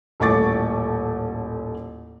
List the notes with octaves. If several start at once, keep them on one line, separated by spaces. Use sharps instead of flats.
D#1 A1 A3 C#6 D6 A6